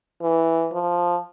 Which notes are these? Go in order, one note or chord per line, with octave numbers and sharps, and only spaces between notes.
E3
F3